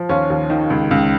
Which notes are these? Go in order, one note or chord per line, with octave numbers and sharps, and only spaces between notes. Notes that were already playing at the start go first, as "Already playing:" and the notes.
Already playing: F3
D#2 C#4 F4
D#2
D#3
C#2
C#2